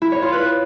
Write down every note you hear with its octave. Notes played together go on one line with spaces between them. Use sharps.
E4
C#5
F4
B4